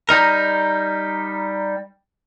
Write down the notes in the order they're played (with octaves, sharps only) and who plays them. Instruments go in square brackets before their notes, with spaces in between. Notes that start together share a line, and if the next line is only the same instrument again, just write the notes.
[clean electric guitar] G3 D#4 A#4